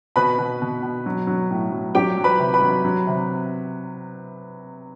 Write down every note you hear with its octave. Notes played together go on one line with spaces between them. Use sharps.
B2 B4 B5
B2
B2
B2
F#3
F#3
A2
F#3
F#3 G4 G5
F#3
B4 B5
C3
B4 B5
F#3
F#3
C3